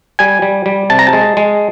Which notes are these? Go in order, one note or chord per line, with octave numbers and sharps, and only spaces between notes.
G3 G#5
G3
G3
C3 A5
A#5
A5
G#3
G#3